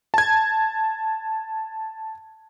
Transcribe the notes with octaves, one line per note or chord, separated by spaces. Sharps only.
A5 G#6